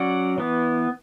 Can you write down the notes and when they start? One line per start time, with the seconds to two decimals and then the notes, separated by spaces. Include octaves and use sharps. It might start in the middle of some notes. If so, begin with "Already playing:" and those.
Already playing: F#3 C#4 D5 F#5
0.38 E3 B3